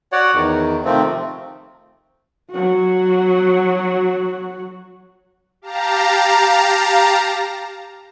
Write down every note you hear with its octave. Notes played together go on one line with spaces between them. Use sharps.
F#4 C#5 D5 F#5
E2 D#3
C3 D#3 F3 A3 C4
F#3 F#4
G4 F5 A5 A#5